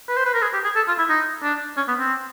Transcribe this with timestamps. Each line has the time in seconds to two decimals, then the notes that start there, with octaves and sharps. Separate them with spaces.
0.08 B4
0.17 C5
0.25 B4
0.34 A#4
0.42 G#4
0.53 G4
0.64 G#4
0.75 A4
0.87 F4
0.98 E4
1.09 D#4
1.43 D4
1.77 C#4
1.88 B3
1.99 C4